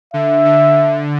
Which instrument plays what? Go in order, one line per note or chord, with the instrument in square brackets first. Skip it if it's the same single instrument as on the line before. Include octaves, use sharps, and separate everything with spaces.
[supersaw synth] D3 [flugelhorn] E5
[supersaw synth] D3